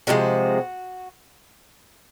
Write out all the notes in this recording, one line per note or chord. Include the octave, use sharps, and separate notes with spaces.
C3 F3 G#3 F#4